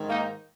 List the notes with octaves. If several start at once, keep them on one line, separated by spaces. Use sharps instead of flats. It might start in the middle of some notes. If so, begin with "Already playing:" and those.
Already playing: G#2 D#3
A#3 D#4